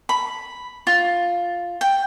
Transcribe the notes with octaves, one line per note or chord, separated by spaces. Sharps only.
B5
F4
G5